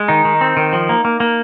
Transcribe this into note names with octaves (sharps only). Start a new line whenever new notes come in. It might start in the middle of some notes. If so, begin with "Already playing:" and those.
Already playing: G#3
D#3 D#4
D#3
C4
D#3
F3
A#3
A#3
A#3